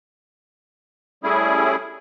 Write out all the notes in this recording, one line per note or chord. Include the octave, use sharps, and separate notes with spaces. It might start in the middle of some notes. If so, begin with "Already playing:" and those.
G3 A3 C#4 E4 G#4